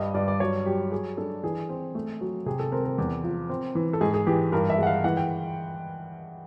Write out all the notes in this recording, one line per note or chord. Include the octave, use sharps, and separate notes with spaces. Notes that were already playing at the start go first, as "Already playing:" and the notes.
Already playing: G2 G3 D#5
G2 D5
D5
F#3 C#5
F#3 G4
F#3 G#4
D4 A4
E3 G#4
C4
A3
F#3
C3 G#4
A4
C4 A#4
A#4
E2
F3
C4
E3
A4
G#2 G#4
G#4
E3 G4
G2 A#4
E5
G#3 F#5
F5
E3 F#5
G5